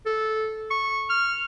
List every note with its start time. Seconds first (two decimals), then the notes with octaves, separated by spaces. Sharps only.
0.06 A4
0.71 C#6
1.10 F6